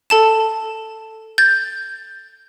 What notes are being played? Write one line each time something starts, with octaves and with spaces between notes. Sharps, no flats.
A4 A5 E7
G6 A6